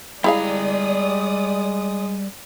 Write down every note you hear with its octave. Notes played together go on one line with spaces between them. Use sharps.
G3 G#3 E4 G#4 D5 F5 A#5 D#6